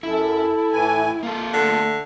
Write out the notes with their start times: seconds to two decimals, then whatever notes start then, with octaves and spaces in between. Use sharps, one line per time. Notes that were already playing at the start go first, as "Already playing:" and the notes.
0.03 F#2 E4 A4
0.72 A2 E3 G#5
1.23 A#3 F4 A4
1.53 D3 A3